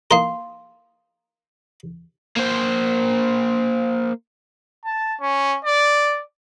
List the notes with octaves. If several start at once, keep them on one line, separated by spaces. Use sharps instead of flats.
A#3 D#4 A#4 F5 C6
A#3 C5
A5
C#4
D5